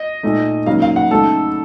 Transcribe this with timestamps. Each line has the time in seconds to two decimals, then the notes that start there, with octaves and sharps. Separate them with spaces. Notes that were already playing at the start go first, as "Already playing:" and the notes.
Already playing: D#5
0.23 A#2 A3 D#4
0.66 C#3 F#3 A#3 D#4 F5
0.82 F5
0.96 F#5
1.11 C#3 A3 D#4 A4